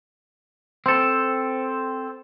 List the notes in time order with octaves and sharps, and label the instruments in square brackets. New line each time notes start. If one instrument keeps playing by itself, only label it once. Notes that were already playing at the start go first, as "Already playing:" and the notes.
[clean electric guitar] C4 A4